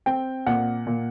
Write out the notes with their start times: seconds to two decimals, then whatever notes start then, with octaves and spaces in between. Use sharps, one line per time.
0.06 C4 G5
0.46 A#2 F#5
0.87 A#2